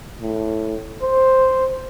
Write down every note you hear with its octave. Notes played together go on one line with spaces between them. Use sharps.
A2
C5